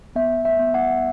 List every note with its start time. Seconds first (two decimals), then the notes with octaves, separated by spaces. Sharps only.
0.16 B3 E5
0.45 E5
0.59 B3
0.74 F#5